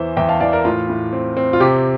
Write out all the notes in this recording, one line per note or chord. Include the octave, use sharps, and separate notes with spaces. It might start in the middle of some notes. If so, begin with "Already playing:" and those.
Already playing: E2 E3 C5 E5
E2 E5 G5
F5 A5
E3 D5 F5
A#4 D5
A2 F4
A2
C4
C4
F4
C3 G4